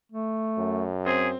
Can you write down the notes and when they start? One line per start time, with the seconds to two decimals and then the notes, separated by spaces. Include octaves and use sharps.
0.12 A3
0.58 F#2
1.06 C4 G#4